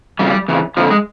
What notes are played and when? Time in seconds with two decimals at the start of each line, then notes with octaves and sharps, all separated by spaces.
0.19 F2 C#3 G3
0.48 F2 C#3 E3
0.77 F2 D3 F3
0.91 G#3